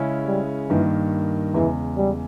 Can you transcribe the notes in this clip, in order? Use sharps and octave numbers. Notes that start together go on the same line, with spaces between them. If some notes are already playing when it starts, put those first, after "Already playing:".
Already playing: C#3 G#3 C#4 E4
G3
G2 D#3 E3 A#3
E2 C#3 E3 G#3
G3